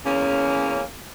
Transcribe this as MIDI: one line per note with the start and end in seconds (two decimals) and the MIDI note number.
0.05 0.82 40
0.05 0.82 58
0.05 0.82 61